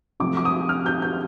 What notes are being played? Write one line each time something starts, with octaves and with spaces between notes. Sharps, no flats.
C3 F3 A3 D6
D6
D#6
F6
G6
G6